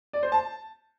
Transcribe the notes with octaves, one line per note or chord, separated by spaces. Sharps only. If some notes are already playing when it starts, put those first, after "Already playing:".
D5
C5
A5